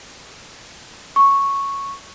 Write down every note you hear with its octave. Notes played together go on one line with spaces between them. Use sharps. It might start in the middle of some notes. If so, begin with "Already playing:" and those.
C#6